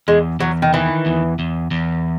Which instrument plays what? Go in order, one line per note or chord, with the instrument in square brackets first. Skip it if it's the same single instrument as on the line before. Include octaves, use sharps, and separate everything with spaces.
[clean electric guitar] E2 [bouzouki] G#3
[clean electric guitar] E2 [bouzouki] F#3
[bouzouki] D#3
[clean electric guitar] D#3 [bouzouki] E3
[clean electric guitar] E2
E2
E2